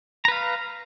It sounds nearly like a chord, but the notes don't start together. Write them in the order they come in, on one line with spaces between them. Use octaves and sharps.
A#5 B4 F5